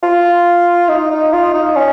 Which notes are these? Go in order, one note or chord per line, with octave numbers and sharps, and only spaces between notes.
F4
D#4
D#4
F4
D#4
C#4